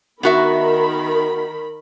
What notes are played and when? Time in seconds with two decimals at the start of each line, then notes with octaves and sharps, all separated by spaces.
0.23 D#3 B3 F#4 A#4 E5 B5